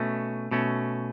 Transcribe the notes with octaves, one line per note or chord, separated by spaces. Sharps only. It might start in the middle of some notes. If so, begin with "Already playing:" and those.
Already playing: B2 A3 C#4
B2 A3 C#4